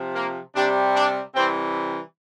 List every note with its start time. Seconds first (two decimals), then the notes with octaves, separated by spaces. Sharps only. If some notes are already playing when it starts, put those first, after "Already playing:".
Already playing: C3 F3
0.15 A#3
0.55 C3 G3 D4
0.95 D4
1.35 C3 E3 G3 C4